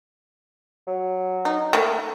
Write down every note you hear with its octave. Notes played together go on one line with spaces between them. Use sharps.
F#3
D#4
A3 A#3